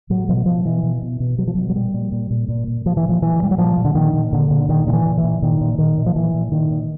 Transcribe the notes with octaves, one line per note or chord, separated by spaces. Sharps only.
A2 F#3
B2 F3
F#3
B2 F3
B2 E3
B2
B2
B2
B2 F#3
F3
B2 F#3
F#3
A#2 G3
A#2
A#2
A#2
A#2
A#2
A#2 F3
E3
A#2
F3
A#2 E3
A#2 G3
F#3
A#2 F3
A#2
D3
A#2 D#3
A#2
A#2 D3
A#2
A#2 D#3
A#2 D#3
E3
A#2
E3
A#2
A#2 D#3
A#2
A#2 D#3
A#2
F3
A#2 E3
A#2
A#2 D#3
A#2